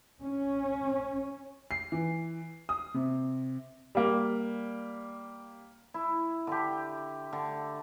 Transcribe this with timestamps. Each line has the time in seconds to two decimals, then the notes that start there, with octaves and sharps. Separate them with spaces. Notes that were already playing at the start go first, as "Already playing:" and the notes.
0.21 C#4
1.71 C7
1.92 E3
2.69 D#6
2.94 C3
3.95 G3 A#3
5.94 E4
6.47 D3 G4
7.33 D3